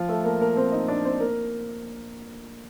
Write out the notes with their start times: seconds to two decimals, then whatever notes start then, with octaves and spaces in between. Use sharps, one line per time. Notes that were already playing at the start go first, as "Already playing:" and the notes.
Already playing: F3 F4
0.09 A3 A4
0.24 A#3 A#4
0.40 A#3 A#4
0.56 C4 C5
0.72 D#4 D#5
0.88 D4 D5
1.04 C4 C5
1.20 A#3 A#4